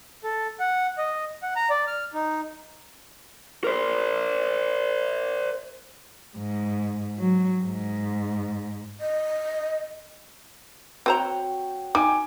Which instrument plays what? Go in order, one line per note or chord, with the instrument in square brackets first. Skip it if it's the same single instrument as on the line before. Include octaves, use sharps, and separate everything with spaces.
[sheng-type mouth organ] A4
F#5
D#5
F#5
A#5
D5
F6
D#4
[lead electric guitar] A#4 C5
[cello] G#2
F#3
G#2
[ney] D#5
[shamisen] C4 C5 A#5 [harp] F#4 C#5 G5
[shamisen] D#4 [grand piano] G5 G#5 D6